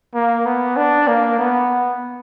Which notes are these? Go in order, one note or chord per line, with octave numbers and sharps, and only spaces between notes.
A#3
B3
D4
A#3
B3